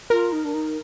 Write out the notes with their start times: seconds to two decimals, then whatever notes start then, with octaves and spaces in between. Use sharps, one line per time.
0.10 F4 A#4
0.32 D#4
0.45 D4
0.54 D#4